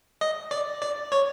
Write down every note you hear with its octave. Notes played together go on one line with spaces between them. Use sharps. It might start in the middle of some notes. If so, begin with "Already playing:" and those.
D#5
D5
D5
C#5